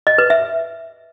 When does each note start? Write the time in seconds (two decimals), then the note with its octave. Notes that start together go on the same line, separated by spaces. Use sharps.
0.07 D#5
0.18 B4
0.30 E5